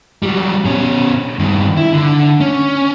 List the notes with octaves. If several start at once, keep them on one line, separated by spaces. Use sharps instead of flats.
F#3 G3
B2 C#4
G2 D#3
E4
D3
C#4